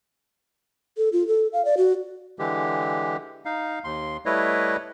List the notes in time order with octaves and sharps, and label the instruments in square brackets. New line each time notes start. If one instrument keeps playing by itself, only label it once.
[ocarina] A4
F4
A4
F5
D5
F#4
[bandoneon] D3 E3 G#3 G4
D#4 F5
D#2 C6
G3 A3 E4 B4 C#5 D#5